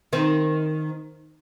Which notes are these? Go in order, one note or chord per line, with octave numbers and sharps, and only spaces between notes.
D#3 C4